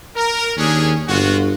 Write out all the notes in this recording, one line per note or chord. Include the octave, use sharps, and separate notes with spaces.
A#4
D#2 C#4 D4 G#4
G1 G#3 F4 F#4